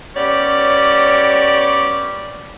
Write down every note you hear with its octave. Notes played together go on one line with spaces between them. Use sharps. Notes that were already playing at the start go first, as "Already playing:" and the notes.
B3 C#4 G4 C#5 D5